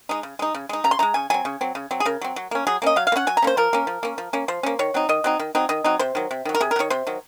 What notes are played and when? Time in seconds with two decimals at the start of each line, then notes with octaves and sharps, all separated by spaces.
0.09 G#3 D#4
0.23 C#3
0.39 G#3 D#4
0.54 C#3
0.69 G#3 D#4
0.84 C#3 A#5
0.91 C6
0.99 G#3 D#4 A#5
1.14 C#3 G#5
1.30 F#3 C4 G#5
1.45 C#3
1.61 F#3 C4
1.75 C#3
1.91 F#3 C4
2.00 G#4
2.05 C#3 A#4
2.21 F#3 C4
2.36 F#3
2.51 A#3 C#4
2.67 F#3 G#4
2.82 A#3 C#4 D#5
2.96 F#3 F5
3.07 F5
3.12 A#3
3.16 C#4 F#5
3.27 F#3 G#5
3.37 A#5
3.42 A#3 C#4 C5
3.57 F3 A#4
3.73 A#3 C#4
3.87 F3
4.03 A#3 C#4
4.18 F3
4.33 A#3 C#4
4.48 F3 C5
4.63 A#3 C#4
4.79 D#3 C#5
4.94 F#3 C4 D#4
5.09 D#3 D#5
5.24 F#3 C4 D#4
5.39 D#3
5.55 F#3 C4 D#4
5.69 D#3 D#5
5.84 F#3 C4 D#4
5.99 C3 C5
6.15 D#3 F#3
6.31 C3
6.45 D#3 F#3
6.55 A#4
6.61 C3 G#4
6.71 A#4
6.76 F#3
6.79 D#3 C#5
6.90 C3 C5
7.07 D#3 F#3